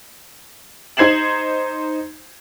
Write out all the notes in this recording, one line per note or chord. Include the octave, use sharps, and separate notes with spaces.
D#4 C5 G#6 C7 E7 F#7